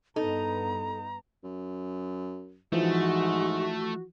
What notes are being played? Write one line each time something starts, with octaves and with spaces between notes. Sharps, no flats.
G2 B3 D#4 A4 A#5
F#2
G#2 E3 F3 A3 F#4